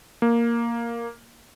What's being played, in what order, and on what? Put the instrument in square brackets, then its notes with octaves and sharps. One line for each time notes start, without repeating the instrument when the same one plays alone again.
[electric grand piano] A#3